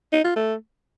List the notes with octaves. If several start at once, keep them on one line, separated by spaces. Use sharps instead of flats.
D#4
F4
A3